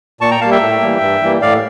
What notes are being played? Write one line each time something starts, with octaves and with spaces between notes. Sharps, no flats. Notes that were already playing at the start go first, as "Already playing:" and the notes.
A#2 A5 C#6
G5 A#5
G3 A#3 F5 A5
E5 G5
A2
E3 G3 A#3
G2
E3 G3 A#3
A2 D5 F5